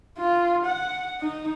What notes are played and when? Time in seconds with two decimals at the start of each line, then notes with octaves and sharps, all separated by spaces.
0.18 F4
0.66 F#5
1.20 D#4